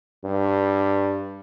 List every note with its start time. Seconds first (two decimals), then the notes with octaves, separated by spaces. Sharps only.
0.25 G2